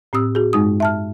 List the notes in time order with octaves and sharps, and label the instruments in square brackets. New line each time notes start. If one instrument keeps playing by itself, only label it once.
[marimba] A2 C4 G4 D#6 E6
F#4 G#4
G2 G#3 D#4 D#6
E5 A5 F6